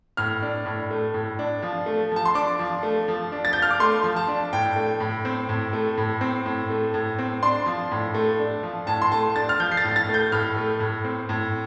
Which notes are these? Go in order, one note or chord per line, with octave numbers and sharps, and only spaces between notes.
A2 F6
D4
A2
A3
A2
D4
F3
A3
F3 A5
C6
D4 D6
F3
A3
F3
D4
A6
F3 G6
F6
D6
A3 C6
F3
A5
D4
A2 G5
A3
A2
C4
A2
A3
A2
C4
A2
A3
A2
C4
D4 C6
F3
A2
A3
D4
F3
A2 A5
C6
A3 A5
D4 A6
F6
F3 G6
C7
A6
A2
A6
A3
G6
A2 F6
A3
A2
C4
A2